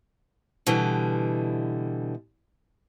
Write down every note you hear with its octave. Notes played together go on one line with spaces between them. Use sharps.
B2 D3 E3 G3